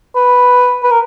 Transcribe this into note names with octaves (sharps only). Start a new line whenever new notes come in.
B4
B4
A#4